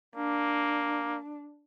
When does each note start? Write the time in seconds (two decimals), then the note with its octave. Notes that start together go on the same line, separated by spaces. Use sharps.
0.16 A#3 D4